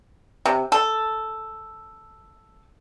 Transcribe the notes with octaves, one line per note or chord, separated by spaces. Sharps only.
C3
A4